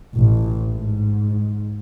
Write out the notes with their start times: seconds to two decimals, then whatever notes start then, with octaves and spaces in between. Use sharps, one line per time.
0.15 A1
0.75 G#2